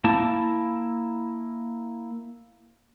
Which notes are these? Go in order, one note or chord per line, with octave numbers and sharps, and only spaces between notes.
A#3 E4 A5